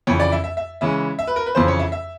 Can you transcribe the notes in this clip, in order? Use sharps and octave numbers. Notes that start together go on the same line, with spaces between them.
F2 C#3 E3 C#5
D5
E5
E5
E5
C#3 E3 G#3 C#4 E5
E5
B4
A#4
B4
F2 C#3 E3 C5
C#5
E5
E5